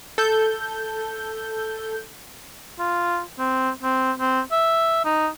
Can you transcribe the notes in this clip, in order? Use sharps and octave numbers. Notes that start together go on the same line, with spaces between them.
A4 G6
F4
C4
C4
C4
E5
D#4